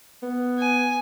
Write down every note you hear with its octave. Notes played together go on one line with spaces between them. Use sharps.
B3
G#5